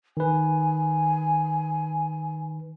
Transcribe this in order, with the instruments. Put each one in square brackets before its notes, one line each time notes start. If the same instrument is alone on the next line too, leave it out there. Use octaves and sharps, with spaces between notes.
[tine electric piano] D#3 B4 [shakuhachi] G#5